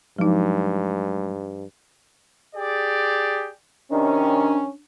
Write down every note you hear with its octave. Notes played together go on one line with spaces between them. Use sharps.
G2 F3 F#3 G#3 D#4
G4 G#4 D5
C3 D#3 C#4 D4